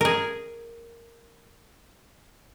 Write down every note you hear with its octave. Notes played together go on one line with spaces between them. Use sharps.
G#4 A#4